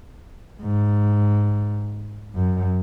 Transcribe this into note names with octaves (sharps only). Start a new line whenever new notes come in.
G#2
F#2